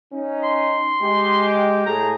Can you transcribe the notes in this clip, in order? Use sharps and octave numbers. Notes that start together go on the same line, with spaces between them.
C#4 D#4
C6
G#3 G4
G5
A2 A3 G#4 A#5